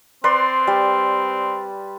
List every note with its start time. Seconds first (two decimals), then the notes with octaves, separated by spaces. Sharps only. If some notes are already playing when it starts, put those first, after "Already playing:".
0.24 C4 B4 D5 C6
0.67 G3